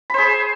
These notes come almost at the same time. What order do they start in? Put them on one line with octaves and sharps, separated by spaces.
B5 C5 G#4